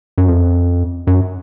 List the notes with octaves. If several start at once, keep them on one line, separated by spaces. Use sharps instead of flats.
F#2
F2
F#2